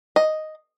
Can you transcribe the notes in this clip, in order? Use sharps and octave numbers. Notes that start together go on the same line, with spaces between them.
D#5